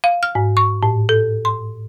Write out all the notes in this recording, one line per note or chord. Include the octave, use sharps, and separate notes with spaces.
F5
F6
G#2
C#6
A2
A4
C6